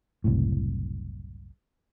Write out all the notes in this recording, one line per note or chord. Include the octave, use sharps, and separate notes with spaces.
F#1 C2 A2